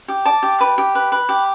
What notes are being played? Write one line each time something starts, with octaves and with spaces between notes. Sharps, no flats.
G4
D5 A5
G4
B4
G4
B4
B4
G4